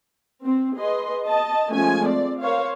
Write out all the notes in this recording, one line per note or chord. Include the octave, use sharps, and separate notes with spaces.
C4
G#4 B4 D#5 C6
D#5 A5
F3 G#3 A3 C#4 G#5
C4 D5
A#4 C5 C#5 F5